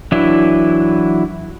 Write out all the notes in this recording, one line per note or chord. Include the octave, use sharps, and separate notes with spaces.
E3 F#3 D4 E4